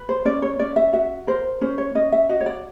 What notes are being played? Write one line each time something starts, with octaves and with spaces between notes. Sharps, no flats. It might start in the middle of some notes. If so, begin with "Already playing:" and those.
Already playing: B4
C5
C#4 D5
C#5
C#4 D5
E5
F#4 E5
A#4 C5
C#4 C5
C#5
C#4 D#5
E5
F#4 D#5
C#5
D5